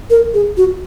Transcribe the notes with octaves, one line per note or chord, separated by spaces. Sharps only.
A#4
G#4
F#4